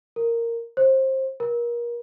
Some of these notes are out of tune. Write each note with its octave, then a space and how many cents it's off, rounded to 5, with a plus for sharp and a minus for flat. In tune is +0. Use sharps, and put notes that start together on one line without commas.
A#4 -10
C5 +25
A#4 +30